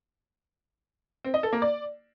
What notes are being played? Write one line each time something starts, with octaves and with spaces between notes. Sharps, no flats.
C4
D#5
A4
A#3
D5